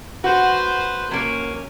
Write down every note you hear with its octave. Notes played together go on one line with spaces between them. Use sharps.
F#4 B4 C5
F#3 A#3 C#4